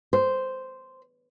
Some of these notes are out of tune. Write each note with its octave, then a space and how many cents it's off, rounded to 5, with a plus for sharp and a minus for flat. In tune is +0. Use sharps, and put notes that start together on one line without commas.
C5 -5